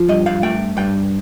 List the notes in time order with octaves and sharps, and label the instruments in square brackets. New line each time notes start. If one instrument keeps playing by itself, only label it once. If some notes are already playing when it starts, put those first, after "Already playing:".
Already playing: [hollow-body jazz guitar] F3
G2 D#5
F5
A3 G5
G2 G5